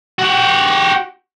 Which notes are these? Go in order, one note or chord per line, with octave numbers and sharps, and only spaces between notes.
F#4 G4